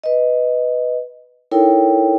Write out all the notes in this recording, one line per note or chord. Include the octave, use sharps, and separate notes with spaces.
B4 D#5
D#4 E4 A4 A#4 C#5 G5